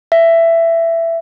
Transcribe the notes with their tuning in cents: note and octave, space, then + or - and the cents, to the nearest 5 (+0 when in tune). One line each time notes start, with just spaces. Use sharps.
E5 +15